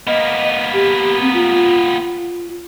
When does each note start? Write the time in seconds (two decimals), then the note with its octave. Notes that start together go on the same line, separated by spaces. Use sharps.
0.07 A#3 B3 D#5
0.73 G4
1.21 C4
1.34 F4